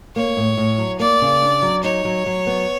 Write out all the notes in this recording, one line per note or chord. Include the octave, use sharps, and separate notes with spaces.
A#3 C#5
A2
A2
F#3
A#3 D5
C#3
D4
F#3
D#4 C#5
F#3
F#3
B3